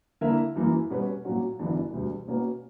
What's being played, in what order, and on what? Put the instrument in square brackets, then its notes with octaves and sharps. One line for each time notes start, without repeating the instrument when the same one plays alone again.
[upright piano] D3 A#3 E4 A#4 E5
F#2 E3 A#3
B2 G3 C#4 F#4 B4
A#2 F#3 C#4 F#4
G1 F#2 E3 B3 D4
E1 D2 D3 G3
B2 A#3 C#4 F#4 B4